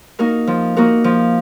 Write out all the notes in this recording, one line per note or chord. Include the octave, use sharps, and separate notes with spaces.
A#3 D#4 F#4 A#4
F3
A#3 D#4 F#4 A#4
F3